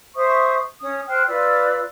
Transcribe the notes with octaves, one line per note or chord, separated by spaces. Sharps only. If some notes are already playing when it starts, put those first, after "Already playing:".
C5 E5 C#6 D#6
C#4 D#6
C5 G5 F6 F#6
F4 B4 D5 E6